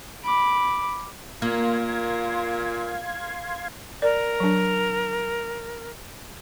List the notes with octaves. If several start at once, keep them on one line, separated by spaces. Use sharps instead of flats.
B5 D6
A#2 A#3 F5 C6 G#6
A#4 D5
F#3 D4